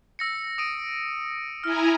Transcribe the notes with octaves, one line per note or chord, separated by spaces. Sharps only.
E6 A#6 C#7
D#6 D7 D#7
E4 G#5 A#5 F6